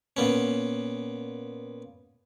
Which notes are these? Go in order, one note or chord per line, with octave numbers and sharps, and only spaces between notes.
A#2 B3 C#4